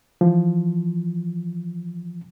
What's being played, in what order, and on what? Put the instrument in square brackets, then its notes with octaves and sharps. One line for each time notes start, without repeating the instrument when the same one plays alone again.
[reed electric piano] E3 F3